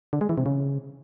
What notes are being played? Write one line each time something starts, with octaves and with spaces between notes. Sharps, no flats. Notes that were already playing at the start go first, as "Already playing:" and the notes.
D3
G#3
E3
C3
C#3